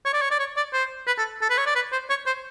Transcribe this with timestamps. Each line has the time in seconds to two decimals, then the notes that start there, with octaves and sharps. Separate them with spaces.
0.05 C#5
0.14 D5
0.22 C#5
0.31 D5
0.40 C#5
0.57 D5
0.73 C5
1.07 B4
1.18 A4
1.42 A4
1.50 B4
1.58 C#5
1.66 D5
1.75 B4
1.92 C5
2.10 C#5
2.26 C5